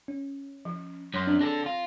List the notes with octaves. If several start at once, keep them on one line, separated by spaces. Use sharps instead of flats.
C#4
F3
F#2 C#5 C6
C4 D4
D4 G#4 A4 A#6
F4